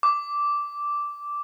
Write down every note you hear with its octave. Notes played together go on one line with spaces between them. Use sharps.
D6